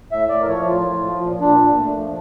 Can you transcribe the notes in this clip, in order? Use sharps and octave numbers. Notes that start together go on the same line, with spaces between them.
A2 E5
A2 D5
A#4
F3 C#5
A2 F4
A2
F3
A#2
A#2 D4
A#2
A3
F3